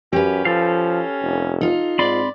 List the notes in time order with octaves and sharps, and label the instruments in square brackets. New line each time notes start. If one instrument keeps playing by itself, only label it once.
[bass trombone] F#2 [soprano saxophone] C#4 [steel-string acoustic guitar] G4 B4
[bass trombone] F3 [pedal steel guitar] A4 F5
[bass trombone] F1
[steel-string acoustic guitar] D#4 F4
[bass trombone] G#2 [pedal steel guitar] C4 B5 C6 [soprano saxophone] D5